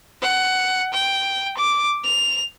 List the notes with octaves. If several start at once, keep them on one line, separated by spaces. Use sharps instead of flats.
F#5
G5
D6
F7